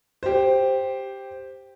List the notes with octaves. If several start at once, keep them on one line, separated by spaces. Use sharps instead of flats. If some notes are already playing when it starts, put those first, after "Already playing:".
G4 C5